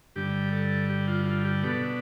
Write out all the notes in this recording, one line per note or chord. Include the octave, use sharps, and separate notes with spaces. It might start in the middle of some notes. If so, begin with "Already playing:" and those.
G2 D3 G3 G4
A4
G4
F4
F4
G4
B2 B3 D4 A4